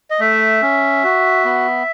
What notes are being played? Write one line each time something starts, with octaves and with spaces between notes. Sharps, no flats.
D#5
A3 E5
C#4
F#4
B3